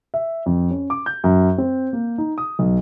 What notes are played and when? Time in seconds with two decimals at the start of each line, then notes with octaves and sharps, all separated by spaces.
0.14 E5
0.46 F2
0.71 C#4
0.90 D6
1.06 G6
1.24 F#2
1.58 C4
1.93 A#3
2.18 D#4
2.38 D#6
2.59 B1